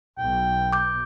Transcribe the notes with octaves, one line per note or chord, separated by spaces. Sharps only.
B1 G5
D6 G6